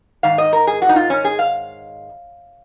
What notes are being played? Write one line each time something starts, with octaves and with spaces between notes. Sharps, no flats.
G#2 D#3 F5
D#5
A#4
G#4
F#4
D#4
F4
C#4
G#4
F5